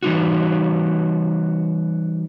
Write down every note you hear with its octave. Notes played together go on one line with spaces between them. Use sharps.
E3 G3 D#4 F#4